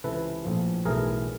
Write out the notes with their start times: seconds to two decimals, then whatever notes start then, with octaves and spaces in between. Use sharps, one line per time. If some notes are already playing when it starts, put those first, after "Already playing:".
0.04 C#2 C3 E3 A4 B4
0.45 A#1 A2 F3
0.85 B1 A2 E3 G#4 A#4